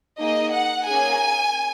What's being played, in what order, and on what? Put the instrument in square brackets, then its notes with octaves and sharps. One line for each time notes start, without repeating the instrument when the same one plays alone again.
[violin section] A#3 D#4 G#4 D#5
F#5
A#3 C#4 G#4 G#5